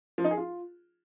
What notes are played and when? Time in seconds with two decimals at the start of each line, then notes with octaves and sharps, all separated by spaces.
0.18 F3
0.24 D#4
0.31 G#4
0.37 F4